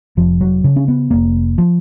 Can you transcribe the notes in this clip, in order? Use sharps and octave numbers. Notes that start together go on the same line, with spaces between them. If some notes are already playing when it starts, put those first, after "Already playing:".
F1 F3
F#3
C#3
C#4
B3
F1 A#3
F3